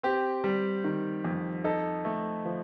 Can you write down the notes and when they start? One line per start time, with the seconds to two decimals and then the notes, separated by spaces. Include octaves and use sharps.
0.03 C4 G4
0.44 G3
0.84 D#3
1.25 F2
1.64 D#4 A4
2.05 A3
2.45 F3